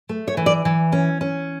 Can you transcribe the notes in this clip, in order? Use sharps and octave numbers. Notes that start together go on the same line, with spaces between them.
A3
C#5
E3
D5
E3
C#4
C#4